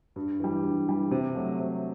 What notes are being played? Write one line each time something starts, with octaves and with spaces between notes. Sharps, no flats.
G2
E3 G3
G2
E3 G3
C3
F#3 A3
C3